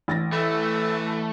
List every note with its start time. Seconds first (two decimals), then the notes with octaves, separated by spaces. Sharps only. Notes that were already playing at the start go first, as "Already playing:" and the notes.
0.08 A1 A6 A#6
0.32 E3 A3 A4